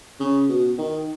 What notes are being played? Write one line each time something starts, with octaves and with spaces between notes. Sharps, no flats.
C#3
B2
D#3